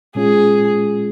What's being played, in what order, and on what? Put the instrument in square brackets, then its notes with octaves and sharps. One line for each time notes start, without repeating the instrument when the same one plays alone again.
[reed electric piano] A#2 G#3 C#4 F4 [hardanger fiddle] G#4